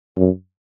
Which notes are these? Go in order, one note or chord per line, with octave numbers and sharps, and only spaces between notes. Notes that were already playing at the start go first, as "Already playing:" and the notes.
F#2